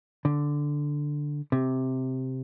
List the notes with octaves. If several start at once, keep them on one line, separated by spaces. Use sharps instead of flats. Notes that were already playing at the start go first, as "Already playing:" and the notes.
D3
C3